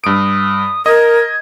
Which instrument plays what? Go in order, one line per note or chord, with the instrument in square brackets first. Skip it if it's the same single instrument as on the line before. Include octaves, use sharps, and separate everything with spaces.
[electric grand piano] G2 D7 [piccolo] D#6
[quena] A#4 [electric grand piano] D#5 D#6 [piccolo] G#6